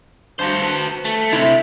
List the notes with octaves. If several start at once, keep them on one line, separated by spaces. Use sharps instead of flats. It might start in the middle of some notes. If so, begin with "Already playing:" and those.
G2 F#4 C5 A5
B4
A3
C3 G#3 A3 E4